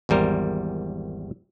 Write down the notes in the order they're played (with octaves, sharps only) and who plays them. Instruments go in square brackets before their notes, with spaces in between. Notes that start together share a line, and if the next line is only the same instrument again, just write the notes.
[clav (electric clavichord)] G#1 E2 G3 A#4 C5